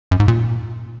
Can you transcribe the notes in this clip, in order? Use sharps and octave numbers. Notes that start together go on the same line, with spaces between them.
F#2
G#2
A#2